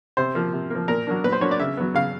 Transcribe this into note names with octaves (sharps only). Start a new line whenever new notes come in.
C3 C5
F3 A#3
C3
F3 A#3
A#2 A#4
F#3 A#3 D4
A#2 B4
C5
F#3 A#3 D4 C#5
D5
C#3 E5
F#3 B3
C#3 F5